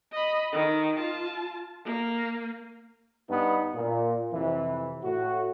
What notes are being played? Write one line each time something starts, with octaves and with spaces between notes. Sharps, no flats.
D#5 B5
D#3
F4 A5
A#3
G2 B3 D#4
A#2
F2 C3 E3
A2 F#4